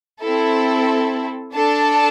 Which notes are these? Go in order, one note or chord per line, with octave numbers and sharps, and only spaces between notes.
C4 E4 A4
D4 A4 A5